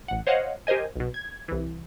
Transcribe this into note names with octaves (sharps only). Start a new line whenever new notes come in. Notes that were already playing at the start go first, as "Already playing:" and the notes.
A1 F#5
C5 C#5 D#5 F5 F#5
G4 A#4 C5 D#5 G#5
B1 B2
G#6
C2 E3